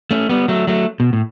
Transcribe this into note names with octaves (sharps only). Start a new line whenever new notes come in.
A3 C#4
G3 B3
F#3 A3
F#3 A3
B2
A2